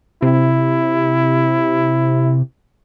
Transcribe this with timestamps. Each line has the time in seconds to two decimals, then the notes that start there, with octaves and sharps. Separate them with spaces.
0.22 C3 E4